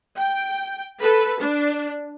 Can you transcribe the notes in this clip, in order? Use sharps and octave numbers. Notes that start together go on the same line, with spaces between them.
G5
A4 B4
D4